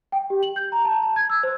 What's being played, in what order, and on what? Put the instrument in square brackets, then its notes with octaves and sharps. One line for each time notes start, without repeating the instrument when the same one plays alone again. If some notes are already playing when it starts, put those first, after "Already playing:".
[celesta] G5
G4
F#7
G6
A#5
A5
A5
G#6
E6
C5